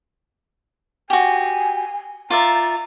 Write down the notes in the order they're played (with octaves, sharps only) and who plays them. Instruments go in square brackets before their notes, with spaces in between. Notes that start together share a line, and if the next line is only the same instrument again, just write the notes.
[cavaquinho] F#4 G4 [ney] G#5
[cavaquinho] F4 D5 E5 [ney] A#5